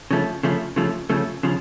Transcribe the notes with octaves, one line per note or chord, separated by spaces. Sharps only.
C#3 F3 A3
C#3 F3 A3
C#3 F3 A3
C#3 F3 A3
C#3 F3